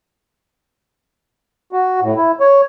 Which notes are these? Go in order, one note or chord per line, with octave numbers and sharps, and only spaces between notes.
F#4
A2
E4
C#5